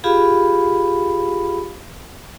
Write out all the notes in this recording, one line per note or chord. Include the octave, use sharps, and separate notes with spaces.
F4 G4 G#4 F5 B5